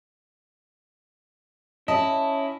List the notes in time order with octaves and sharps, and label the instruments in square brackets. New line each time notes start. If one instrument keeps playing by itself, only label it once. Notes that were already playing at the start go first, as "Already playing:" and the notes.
[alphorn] C#4 [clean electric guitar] E4 [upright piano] D#5 [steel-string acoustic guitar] A5